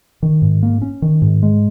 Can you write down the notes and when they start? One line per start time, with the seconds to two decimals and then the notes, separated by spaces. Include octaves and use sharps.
0.23 D#3
0.42 G#2
0.63 A#3
0.82 C#4
1.02 D#3
1.22 G#2
1.43 G#3